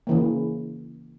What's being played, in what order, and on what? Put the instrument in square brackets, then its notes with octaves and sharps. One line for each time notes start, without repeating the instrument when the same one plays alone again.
[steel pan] C#3 E3 A#3